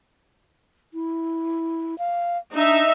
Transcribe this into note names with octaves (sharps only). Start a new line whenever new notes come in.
E4
F5
D4 D#4 E5